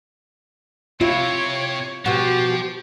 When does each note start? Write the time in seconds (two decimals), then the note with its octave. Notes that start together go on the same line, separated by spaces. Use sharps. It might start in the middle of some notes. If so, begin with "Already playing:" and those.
1.01 C3 E4 F4 C#5
2.06 B2 F3 F#4 G4